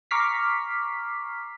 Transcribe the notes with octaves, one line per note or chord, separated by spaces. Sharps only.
A#5 C#6 D6 F6 B6 C7